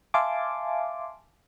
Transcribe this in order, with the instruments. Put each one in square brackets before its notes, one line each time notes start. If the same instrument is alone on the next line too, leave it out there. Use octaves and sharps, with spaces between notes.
[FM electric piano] E5 F5 G#5 A5 C6 D6